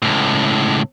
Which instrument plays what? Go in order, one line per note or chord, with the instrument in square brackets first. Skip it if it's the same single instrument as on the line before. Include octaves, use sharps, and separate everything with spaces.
[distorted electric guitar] C#2 A2